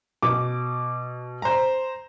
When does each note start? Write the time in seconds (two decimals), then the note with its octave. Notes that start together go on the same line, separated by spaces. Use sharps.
0.22 B2 D6
1.42 C5 A#5